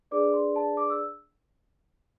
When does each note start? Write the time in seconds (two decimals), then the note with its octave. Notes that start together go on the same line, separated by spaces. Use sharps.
0.11 D4 G#4 B4 D5 D6
0.34 C6
0.56 A5
0.77 D6
0.90 E6